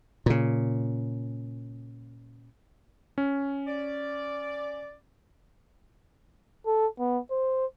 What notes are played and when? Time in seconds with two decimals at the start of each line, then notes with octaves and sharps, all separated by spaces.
0.26 A#2 C#3
3.18 C#4
3.68 D5
6.66 A4
6.99 B3
7.31 C5